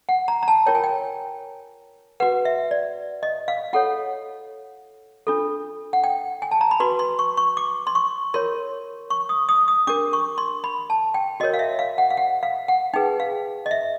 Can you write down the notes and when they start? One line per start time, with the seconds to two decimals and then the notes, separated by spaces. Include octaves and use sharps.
0.09 F#5
0.28 A#5
0.43 A#5
0.48 A5
0.66 F4 A#4 C#5 G5
0.75 G#5
0.84 G5
2.20 F#4 B4 F#5
2.45 E5
2.71 D5
3.23 D#5
3.48 F5
3.73 F4 A4 C#5 F#5
5.27 D4 F4 A4
5.93 F#5
6.04 G5
6.42 G#5
6.51 A5
6.61 A#5
6.71 B5
6.80 F#4 B4 C6
6.99 C6
7.19 C#6
7.37 C#6
7.57 D6
7.87 C6
7.95 C#6
8.34 F4 A#4 C#5 C6
9.10 C#6
9.29 D#6
9.49 D#6
9.68 D#6
9.87 D4 G4 A#4 D6
10.13 C#6
10.38 C6
10.64 B5
10.90 A5
11.14 G5
11.40 F#4 A#4 C#5 D#5
11.54 F5
11.59 E5
11.79 F5
11.98 F#5
12.10 F5
12.17 F#5
12.43 F5
12.68 F#5
12.94 D#4 G#4 B4 G5
13.20 F5
13.66 D#5
13.71 E5